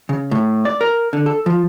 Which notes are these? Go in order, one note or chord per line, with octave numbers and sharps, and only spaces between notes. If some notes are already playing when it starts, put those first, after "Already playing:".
C#3
A2
D5
A#4
D3
A4
F3